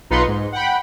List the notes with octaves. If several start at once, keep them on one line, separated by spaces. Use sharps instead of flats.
B1 D#4 F4 B4 C6 C#7
G#2
F#5 G5 B5